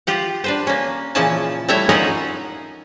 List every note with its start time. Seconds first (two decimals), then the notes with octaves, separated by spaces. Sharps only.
0.07 F4 G4 F#5
0.44 D4 B4 C5
0.67 A#3 C#4
1.15 A#2 C#3 E3 F3 C#4 A5
1.68 G3 A3 E4 C#5 E5
1.89 C#4 D#4 F4 A#4 F#5 G#5